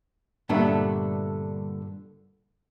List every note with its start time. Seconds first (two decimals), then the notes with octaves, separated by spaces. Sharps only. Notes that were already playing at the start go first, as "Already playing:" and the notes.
0.49 G2 A#2 D3 A3 B3 D4